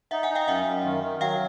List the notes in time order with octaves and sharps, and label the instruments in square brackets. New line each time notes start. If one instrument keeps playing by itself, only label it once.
[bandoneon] D#4 [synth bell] E5 F#5
[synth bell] F#5 G#5
[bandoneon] D#4
[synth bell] F5 G5
[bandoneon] F#2 [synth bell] E5 F#5
[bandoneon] F#2
D#3
D#3
[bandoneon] F#3 [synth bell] F5 G5